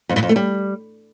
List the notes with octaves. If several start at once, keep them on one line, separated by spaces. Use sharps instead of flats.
F2
G2
F2
A3
G3